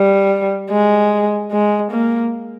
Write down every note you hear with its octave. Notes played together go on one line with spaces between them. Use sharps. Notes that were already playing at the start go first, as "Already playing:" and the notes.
Already playing: G3
G#3
G#3
A#3